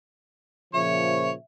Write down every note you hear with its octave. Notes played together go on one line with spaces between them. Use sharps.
A#2 C#3 F3 C#5 E5